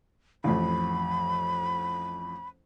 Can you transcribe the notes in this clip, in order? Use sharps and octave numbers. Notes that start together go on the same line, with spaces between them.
A1 F2 B5